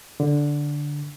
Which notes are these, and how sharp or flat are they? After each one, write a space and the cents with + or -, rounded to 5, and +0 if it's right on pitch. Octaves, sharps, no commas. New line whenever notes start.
D3 -5